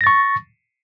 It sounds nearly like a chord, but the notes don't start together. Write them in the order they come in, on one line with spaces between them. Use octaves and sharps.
A#6 A6 C#6